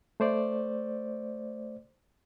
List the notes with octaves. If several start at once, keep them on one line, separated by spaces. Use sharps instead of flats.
A3 C5 D5